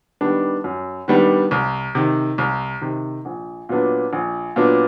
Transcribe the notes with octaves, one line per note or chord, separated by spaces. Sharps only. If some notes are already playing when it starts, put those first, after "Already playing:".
D#3 G3 B3 D4
F#2
D#3 G3 B3 D4
C2
C3 D#3
C2
C3 D#3
A#1
A#2 F#3 B3 D4
A#1
A#2 F#3 B3 D4